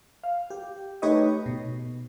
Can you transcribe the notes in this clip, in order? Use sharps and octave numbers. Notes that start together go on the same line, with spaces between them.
F5
G4
A3 D#4 G4 B4 C#5 D#5
B2